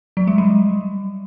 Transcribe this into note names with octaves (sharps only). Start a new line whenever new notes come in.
F#3
G#3
G3